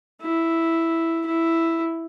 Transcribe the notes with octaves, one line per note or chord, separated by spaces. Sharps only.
E4
E4